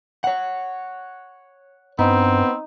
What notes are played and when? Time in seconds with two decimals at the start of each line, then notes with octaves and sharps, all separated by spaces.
0.24 C#5 F#5
1.99 G2 B3 C4 D#4